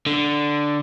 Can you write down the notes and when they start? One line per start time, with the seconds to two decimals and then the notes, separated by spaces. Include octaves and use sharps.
0.06 D3